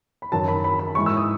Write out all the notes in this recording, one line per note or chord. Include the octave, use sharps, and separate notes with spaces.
B5
F#2 D#3 F#3 A5
B5
B5
B5
G#2 E3 C#6
E6
D#6